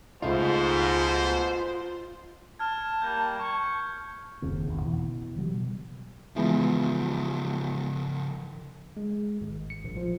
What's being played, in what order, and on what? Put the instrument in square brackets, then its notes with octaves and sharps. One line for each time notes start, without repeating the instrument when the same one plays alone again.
[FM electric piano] C#2 A3 D#4 [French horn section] G#2 B2 [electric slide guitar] F4 [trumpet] C5
[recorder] A5 [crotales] F6 G#6
[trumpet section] G3 A#3 [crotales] G6
[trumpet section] C#6
[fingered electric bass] F#1 D#2 C#3 C4
A1 E2 D#3
B2 E3
C#3 F#3 G3
B2
[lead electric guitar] C#3 F3 [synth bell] E3 G#3 B3
[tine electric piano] G#3
G#1
C#7
A#1
F3